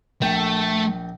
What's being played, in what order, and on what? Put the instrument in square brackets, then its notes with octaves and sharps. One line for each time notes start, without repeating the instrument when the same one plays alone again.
[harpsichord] A#1 G5 [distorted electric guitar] A3